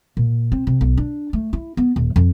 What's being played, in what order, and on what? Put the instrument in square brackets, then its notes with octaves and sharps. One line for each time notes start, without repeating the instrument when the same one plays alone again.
[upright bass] A#2
C4
C3
B1
D4
A3
E4
B3
D#1
F2